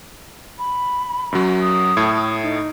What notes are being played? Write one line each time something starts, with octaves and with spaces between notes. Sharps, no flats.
B5
F#2 F#3
D#6
A2 A3 G#6
D#4